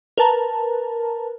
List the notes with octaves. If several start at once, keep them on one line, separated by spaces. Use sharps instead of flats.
A#4 B4 A5 A#5